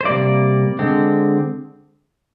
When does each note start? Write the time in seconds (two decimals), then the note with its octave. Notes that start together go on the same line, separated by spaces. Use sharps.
0.01 C5
0.05 C3 G3 A#3 D5
0.79 D3 G#3 C4